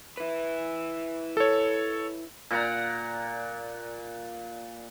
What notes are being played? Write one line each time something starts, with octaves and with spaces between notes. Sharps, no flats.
E4 B4
A4 C#5
A#2 D5 F#5 A#5